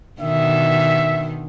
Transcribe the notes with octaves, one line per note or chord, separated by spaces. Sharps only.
B2 D3 D#3 E5